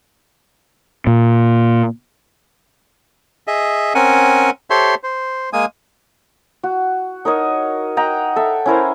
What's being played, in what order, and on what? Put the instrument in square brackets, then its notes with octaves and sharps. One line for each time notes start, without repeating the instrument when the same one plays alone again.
[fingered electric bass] A#2
[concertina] G#4 D#5 E5
C4 C#4 A#4 F#5 G#5
G4 A4 C5 C#5 E5 C6
C5
G#3 A#3 G#5 D#6
[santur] F#4
D#4 A#4 C#5 D#5
D#5 F#5 G5 A#5
A4 E5
C#4 E4 A#4 C5